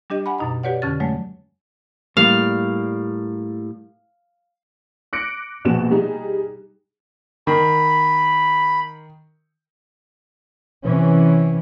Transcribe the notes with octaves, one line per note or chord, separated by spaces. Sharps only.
G3 D4 G4 D#5
F#5 G#5 B5
F#2 B2 D#4 D#5 A#5
F#4 G4 B4 C#5 D5 F#5
F2 D3 C#4 F6 A6
F#3 G#3 A3 C#5
A2 G3 A#3 F5
D6 F#6 A#6 C#7 D7
A#1 B2 B3 F#4 E7
G3 D#4 G#4
D#3 B5
C3 E3 C#4